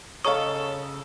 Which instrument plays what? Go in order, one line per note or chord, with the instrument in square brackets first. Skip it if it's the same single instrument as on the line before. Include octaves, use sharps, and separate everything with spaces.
[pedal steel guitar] C#3 D#6 [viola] A4 [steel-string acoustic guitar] C#5 F5 [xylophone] D#5 A#5 C#6